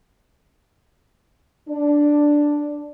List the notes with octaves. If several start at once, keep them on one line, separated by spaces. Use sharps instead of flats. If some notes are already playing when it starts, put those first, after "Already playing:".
D4